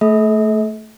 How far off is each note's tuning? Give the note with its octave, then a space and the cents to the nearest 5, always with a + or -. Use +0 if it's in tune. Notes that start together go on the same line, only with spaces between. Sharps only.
A3 +0 A4 -45 E5 -45